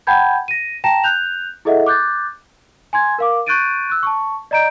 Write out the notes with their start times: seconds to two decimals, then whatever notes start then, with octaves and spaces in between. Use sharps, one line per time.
0.07 F#5 G5 A5 B5 G6 G#6
0.48 A#6 D#7
0.84 G5 A5 A#5 A#6 E7
1.04 F#6 G6 F7
1.65 E4 G#4 A4 D#5 E5 F#5
1.86 D6 F#6 G6 A6
2.93 G#5 C6 G#6
3.18 A#4 F5 D6
3.47 C#6 F#6 G6 A6 D7 D#7
3.90 E6 F#6
4.03 A5 C#6
4.51 D5 D#5 A#5 G6 D7